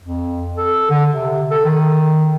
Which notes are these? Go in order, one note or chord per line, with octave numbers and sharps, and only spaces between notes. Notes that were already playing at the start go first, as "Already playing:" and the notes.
F2
A4
D3
C3
A4
D#3